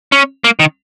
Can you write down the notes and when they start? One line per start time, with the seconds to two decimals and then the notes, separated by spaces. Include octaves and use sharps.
0.12 C#4
0.44 A#3
0.59 D#3